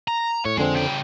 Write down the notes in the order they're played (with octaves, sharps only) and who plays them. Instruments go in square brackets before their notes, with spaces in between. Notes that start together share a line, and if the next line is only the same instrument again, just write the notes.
[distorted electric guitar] A#5
[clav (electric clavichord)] A2 [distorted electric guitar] C#5
[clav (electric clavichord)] F2 D3 C4 [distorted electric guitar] G#3
[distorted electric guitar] C#3 G5